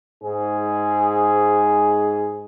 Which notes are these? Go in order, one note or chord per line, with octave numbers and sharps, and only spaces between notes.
G#2 G#4